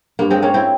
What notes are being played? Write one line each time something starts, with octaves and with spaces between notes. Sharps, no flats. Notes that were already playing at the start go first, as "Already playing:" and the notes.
G2 A#3
G#3 C4
G#3 A#3 C#4
C4 E4